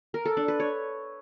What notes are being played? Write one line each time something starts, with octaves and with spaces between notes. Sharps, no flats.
A#4
A4
D4
B4
C#5